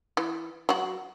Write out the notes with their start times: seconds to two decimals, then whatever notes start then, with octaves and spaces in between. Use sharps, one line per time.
0.17 E3
0.69 F#3 F#4